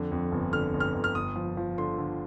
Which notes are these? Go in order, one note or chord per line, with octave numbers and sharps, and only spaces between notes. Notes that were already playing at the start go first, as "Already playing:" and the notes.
Already playing: F2 D3
F2
G1
D3 F6
G1
F6
G1
F6
G1 D#6
F3
F3
D3 C6
D3